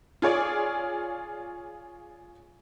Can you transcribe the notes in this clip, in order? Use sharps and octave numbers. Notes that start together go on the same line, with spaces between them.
F4 G#4 C#5 D5